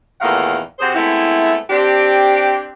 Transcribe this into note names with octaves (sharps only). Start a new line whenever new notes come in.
E2 A#2 D#3 A3 F5 F#5
C3 F#4 G#4 C5
G#3 A3 B3 C4 E4
C4 D4 G4